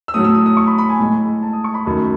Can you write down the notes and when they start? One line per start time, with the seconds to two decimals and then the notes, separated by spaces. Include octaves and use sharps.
0.08 E6
0.14 A2 F#3 A3 D#6
0.24 E6
0.35 D#6
0.46 D#6
0.57 C#6
0.67 B5
0.78 B5
0.89 G#5
0.99 A2 G#3
1.43 A5
1.53 D#6
1.64 C#6
1.74 B5
1.85 F#2 D#3 A3 B5